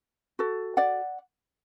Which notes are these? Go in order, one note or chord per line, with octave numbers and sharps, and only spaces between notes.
F#4 A4
D5 F#5